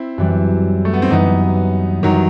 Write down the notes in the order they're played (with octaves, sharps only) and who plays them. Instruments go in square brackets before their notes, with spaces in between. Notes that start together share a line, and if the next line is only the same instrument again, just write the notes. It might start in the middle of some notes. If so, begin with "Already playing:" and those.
Already playing: [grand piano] C4 E4
[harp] F#2 E3 G3
[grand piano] A3
B3
C4
[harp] F#2 E3 G3 [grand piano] B3 D#4
[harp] F#2 E3 G3 [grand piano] D#3 F#3